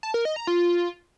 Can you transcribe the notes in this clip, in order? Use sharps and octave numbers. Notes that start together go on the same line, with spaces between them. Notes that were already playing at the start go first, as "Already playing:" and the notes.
A5
A#4
D#5
A#5
F4